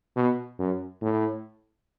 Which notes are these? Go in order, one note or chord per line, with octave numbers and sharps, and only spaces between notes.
B2
F#2
A2